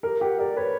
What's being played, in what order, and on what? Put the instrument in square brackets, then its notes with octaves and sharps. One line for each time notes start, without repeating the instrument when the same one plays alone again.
[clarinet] G4 [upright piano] A#4
[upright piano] G4 [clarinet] F#5
[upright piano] A#4 [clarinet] D5
[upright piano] B4 [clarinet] C#5